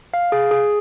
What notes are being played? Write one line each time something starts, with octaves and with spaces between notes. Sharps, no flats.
F5
G#4
G#4